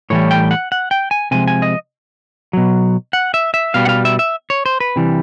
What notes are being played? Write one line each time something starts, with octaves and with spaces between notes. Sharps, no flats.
A2 E3 G3 C#5
G5
F#5
F#5
G5
G#5
C3 F3 G#3 G#5
G#5
D#5
B2 F#3
F#5
E5
E5
B2 G3 F5
F#5
F5
E5
E5
C#5
C5
B4
C3 E3 G3